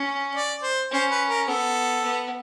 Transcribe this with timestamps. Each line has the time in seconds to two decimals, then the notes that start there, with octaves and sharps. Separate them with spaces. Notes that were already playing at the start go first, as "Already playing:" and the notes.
Already playing: C#4
0.35 D5
0.63 C5
0.91 C#4 C5
1.11 B4
1.29 A#4
1.47 B3 A4
2.04 B3